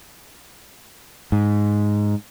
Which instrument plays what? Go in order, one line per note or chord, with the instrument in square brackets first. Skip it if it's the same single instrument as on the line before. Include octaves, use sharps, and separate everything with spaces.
[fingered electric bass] G#2